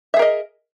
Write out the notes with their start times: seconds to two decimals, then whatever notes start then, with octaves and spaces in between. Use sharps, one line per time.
0.14 E5
0.17 G#4
0.19 A#4
0.22 D#5